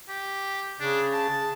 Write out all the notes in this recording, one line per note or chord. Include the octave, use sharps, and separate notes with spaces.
G4
C#3 D4
A5